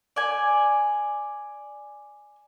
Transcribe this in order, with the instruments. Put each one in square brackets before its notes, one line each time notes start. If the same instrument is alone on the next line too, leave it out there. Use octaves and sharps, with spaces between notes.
[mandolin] D5 G#5